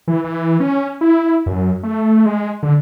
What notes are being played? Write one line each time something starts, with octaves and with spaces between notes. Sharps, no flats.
E3
E3
C#4
E4
F#2
A3
G#3
D3